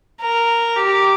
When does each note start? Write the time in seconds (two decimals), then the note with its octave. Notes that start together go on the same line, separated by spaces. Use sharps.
0.21 A#4
0.76 G4